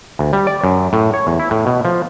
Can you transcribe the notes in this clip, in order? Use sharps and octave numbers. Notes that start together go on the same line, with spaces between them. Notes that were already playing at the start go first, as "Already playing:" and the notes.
D2
G3
D5
F#2
A2
C#5
E2
E4
A2
B2
F3